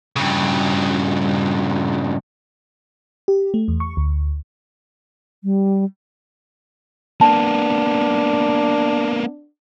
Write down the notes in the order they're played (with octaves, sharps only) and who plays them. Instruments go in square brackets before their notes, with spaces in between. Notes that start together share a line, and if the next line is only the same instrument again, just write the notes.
[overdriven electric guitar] G2 C#3
[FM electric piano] G4
A3
E2
C#6
D2
[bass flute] G3
[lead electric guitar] A#3 B3 [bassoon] D4 [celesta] A5